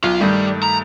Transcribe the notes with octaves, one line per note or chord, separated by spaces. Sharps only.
B1 F4
G2 D#3 G3 A3
A#5